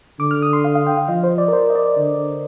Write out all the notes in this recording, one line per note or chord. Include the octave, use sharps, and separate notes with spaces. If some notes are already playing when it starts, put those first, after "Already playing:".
D3 D6
F6
D#6
C6
F5
F5
G5
F5
F3 D#5
C5
D5
A#4
C5
D#5
D5
D3